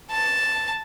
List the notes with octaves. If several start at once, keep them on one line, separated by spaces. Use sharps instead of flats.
A5